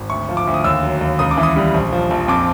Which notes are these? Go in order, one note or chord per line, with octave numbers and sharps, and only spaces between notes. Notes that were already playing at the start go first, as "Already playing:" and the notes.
Already playing: G#1
D2 C#6
F3
D6
D2
D#6
D#2 E6
F#3
D#2
C#2 D#6
D6
E3
D#6
G3
A#1
F3
A#1
F2 D6